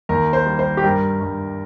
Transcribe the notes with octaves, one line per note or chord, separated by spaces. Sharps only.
D#2 A#4
C5
G3
C5
G4
G2 A#4
G2